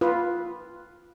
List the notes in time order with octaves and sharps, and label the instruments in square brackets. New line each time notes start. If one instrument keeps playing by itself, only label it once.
[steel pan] F4 B4